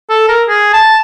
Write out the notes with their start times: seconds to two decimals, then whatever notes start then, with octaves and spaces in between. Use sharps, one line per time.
0.10 A4
0.28 A#4
0.49 G#4
0.73 A5